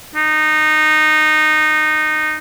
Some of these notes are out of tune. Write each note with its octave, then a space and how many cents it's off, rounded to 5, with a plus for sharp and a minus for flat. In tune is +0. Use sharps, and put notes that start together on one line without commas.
D#4 -15